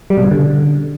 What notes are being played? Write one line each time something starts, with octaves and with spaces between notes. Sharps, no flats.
G3
B2
C#3
D3